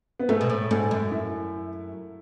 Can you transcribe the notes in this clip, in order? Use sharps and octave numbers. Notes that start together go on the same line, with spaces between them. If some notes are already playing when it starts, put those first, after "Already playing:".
B3
G#2 A3
B2
A2
G#2 A3
F#2
E4